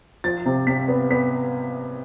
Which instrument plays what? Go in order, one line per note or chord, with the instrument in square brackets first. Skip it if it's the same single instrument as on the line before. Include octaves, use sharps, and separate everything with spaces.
[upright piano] F3 A6
C3
C3 B6
B3
B3 B6